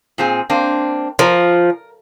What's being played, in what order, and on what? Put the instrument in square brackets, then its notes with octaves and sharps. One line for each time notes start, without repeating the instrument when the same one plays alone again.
[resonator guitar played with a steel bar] A#2 C4 G#4
A#3 C4 D4
[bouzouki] F3 [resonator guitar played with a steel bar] A#4